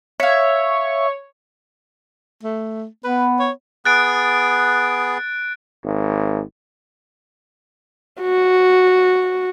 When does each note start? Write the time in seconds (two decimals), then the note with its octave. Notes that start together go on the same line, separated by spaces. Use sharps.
0.20 C#5 E5 F5
2.43 A3
3.04 B3 B4
3.39 C#5
3.85 B3 G#4 F#6 A6 D7
5.84 G#1
8.21 F#4